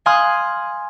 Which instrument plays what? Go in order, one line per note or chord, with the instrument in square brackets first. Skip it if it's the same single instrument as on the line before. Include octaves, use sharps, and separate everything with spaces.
[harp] F5 G#5 C6 D#6 F6 F#6